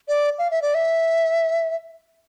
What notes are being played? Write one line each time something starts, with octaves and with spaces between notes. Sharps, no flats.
D5
F5
E5
D5
E5